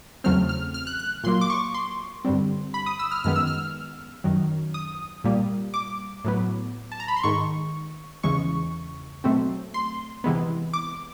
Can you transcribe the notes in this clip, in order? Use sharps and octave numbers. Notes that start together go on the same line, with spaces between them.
E2 C#3 F#3 A3 C4 F6
F6
F6
F#6
F#6
A#2 F#3 A#3 C6
D6
C#6
C6
G2 D3 G3 C4
B5
D#6
E6
F6
F#2 D#3 G#3 B3 F6
E6
F6
F#2 D#3 F#3
D#6
A#2 G3 A#3
D6
A2 F#3 B3
A5
A#5
B5
C6
G#2 D#3 G#3 C#6
E2 C#3 E3 G#3 C#6
B2 F#3 A3 C4
C6
C3 E3 G#3 B3
D6